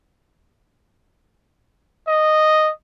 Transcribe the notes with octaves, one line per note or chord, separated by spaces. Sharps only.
D#5